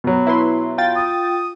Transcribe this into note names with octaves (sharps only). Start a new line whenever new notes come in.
B2 F#3
E4 B4 C6
F4 G5 A6
D#6